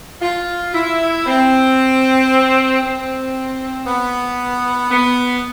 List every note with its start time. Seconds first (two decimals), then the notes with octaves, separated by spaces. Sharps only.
0.22 F4
0.74 E4
1.27 C4
2.83 C4
3.87 B3
4.91 B3